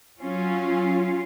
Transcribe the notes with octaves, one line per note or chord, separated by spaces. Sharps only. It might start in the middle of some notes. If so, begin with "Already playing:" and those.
F#3 C#4 F4